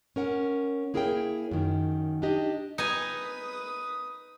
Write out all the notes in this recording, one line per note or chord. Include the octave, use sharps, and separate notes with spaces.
C#4 A#4 F#5
A#3 E4 G#4 A#4 C#5 G5
F#2 D#3
D4 D#4 G4 D#5
D#4 B4 G#5 D#6